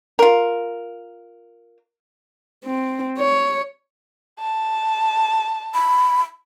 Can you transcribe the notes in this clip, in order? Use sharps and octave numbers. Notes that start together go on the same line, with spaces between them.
F4 A#4
C4
C#5
A5
B5